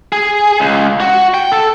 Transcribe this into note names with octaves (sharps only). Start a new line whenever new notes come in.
G#4
C#2
F#4
G5
A4